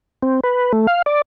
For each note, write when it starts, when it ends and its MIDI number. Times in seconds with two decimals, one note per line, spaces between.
0.23 0.40 60
0.44 0.72 71
0.73 0.87 57
0.87 1.02 77
1.06 1.22 74